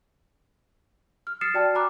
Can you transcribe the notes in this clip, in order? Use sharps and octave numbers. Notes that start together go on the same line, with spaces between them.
F6
D#6 F6 A6 C7 C#7 E7
F#4 D5 G5 A5
G#5 A#5 B5 D6 F6 F#6